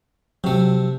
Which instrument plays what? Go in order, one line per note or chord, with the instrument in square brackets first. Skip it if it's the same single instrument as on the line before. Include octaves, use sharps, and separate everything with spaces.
[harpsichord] C3 A3 [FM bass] F#3